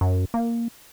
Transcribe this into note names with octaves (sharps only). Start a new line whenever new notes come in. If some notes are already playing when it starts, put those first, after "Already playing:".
F#2
A#3